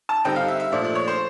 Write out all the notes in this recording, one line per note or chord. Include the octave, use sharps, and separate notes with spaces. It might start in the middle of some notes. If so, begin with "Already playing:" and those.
A5
D3 G3 C4 D#4 G5
F5
E5
E5
A#2 F3 A3 D4
D5
C#5
C5